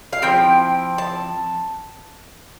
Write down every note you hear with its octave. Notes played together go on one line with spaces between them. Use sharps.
F5
F3 C4 E4 G5
A5